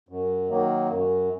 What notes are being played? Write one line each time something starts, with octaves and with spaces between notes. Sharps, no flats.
F#2
D#3 F#3 A#3
F#2